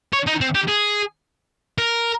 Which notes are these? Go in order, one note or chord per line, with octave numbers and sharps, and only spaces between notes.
C#5
D#4
C4
G4
G#4
A#4